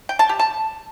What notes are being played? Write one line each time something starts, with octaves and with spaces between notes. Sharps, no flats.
G5
A5
G4
A5